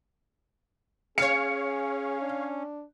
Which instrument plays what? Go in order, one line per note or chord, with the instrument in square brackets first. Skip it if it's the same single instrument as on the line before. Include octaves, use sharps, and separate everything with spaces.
[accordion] C#4 [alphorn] G#4 [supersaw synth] C#5 F5 [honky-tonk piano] C#7
[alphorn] D4